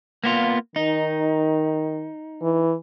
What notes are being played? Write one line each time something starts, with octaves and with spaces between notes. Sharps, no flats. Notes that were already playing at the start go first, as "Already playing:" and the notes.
A#3 B3 F4
D#3 D#4
E3